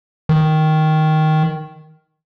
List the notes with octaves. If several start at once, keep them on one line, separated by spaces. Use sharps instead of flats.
D#3